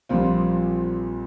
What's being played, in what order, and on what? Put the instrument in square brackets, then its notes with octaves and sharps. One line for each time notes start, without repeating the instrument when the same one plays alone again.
[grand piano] A#1 A#2 G3 C4 F4